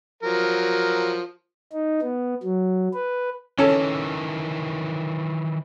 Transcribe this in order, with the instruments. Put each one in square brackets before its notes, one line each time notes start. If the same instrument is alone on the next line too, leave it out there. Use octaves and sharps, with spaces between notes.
[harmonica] F3 F#3 A#4
[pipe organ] D#4
B3
F#3
B4
[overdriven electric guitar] D#3 E3 [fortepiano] C#4 A4